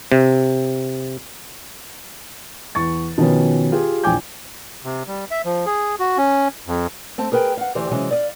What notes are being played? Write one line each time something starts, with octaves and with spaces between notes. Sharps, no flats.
C3
E2 C#6 A6
B2 D#3 F3 B3 C#4
F4 G4 G#4
A#1 E2 G5 G#5 D6 G6
C3
G3
E5
F3
G#4
F#4
C#4
F2
A3 C4 A5
G#4 A#4 B4 G5
F5 F#5
D2 E3 G4 C5 D5
C3 E3 F#3 G#3 C#4
D5 D#5 F5